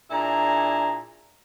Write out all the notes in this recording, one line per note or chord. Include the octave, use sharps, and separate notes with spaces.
A#2 D4 E4 G#4 A#5